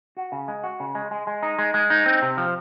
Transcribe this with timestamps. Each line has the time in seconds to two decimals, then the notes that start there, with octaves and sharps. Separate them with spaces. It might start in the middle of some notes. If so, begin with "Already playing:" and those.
0.17 F#4
0.32 C#3
0.48 G#3
0.64 F#4
0.80 C#3
0.95 G#3
1.11 G#3
1.27 G#3
1.43 D#4
1.59 G#3
1.74 G#3
1.90 D#4
2.06 C4
2.22 C3
2.37 F3